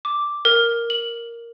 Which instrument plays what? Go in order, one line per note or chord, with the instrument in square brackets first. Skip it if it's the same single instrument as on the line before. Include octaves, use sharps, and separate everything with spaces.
[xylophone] D6
A#4
F#7